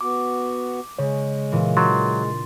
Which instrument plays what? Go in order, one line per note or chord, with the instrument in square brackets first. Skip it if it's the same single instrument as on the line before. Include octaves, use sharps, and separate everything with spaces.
[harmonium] B3 F#4 [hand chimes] D6
[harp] C#3 [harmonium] G#3 [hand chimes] C#5
[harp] A#2 E3
[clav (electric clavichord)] F#3 [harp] D4 [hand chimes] C6 A6